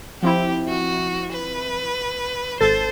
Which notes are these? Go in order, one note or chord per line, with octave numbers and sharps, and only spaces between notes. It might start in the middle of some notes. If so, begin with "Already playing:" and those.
F3 C4 E4 G4
F#4
B4
G#1 A4 C5 A6